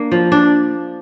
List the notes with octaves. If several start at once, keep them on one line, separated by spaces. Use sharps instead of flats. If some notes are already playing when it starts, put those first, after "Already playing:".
Already playing: A#3 D4
F3
D4